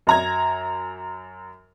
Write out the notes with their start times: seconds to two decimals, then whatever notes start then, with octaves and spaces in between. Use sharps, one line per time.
0.07 F#2 A#5 G#6